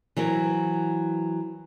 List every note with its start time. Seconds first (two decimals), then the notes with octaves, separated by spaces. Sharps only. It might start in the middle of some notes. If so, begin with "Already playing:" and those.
0.17 E3 F#3 C4 A#4